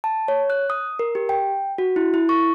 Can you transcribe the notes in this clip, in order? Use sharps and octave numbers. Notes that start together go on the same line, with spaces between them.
A5
C#5
F#6
D#6
A#4
G4
G5
F#4
E4
E4
C#6